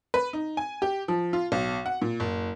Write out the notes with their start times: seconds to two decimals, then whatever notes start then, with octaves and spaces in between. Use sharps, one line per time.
0.14 B4
0.33 D#4
0.57 G#5
0.82 G4
1.08 F3
1.33 F4
1.52 B1
1.86 F#5
2.02 A#2
2.20 F#1